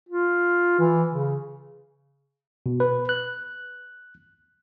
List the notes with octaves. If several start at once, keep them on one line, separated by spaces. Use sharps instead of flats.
F4
E3
C#3
B2
B4
F#6